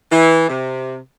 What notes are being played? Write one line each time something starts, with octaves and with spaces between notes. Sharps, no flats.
E3
C3